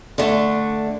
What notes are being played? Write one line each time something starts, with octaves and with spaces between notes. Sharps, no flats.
D3 A3 D4